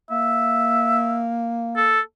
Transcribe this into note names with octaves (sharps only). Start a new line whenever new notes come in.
A#3 E5
A4